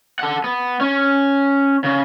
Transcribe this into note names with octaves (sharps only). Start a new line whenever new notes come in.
A4 F#5
B3
C#4
C#3